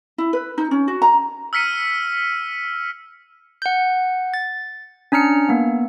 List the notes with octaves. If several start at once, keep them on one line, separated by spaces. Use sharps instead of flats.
E4
B4
D#4
C#4
F#4
A#5
E6 F6 B6 C#7 D#7
F#5 G6
A6
C#4 D4 A#5 F6 C#7
A#3 B3